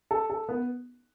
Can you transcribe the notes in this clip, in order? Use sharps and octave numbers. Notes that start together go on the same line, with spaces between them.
A4
A4
B3